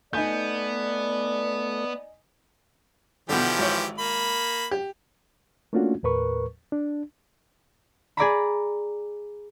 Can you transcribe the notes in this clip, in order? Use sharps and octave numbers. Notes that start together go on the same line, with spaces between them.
A3 B3 D#4 D5 G#5 G6
B2 D3 E3 F3 G4
G#1 C#5
A#3 B5
G4
A3 A#3 C#4 D4 F4 F#4
D#2 A2 A#4 B4 C#6
D4
G#4 D5 A#5 B5